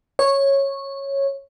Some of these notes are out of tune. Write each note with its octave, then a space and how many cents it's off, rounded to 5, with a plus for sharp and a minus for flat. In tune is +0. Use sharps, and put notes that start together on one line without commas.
C#5 -10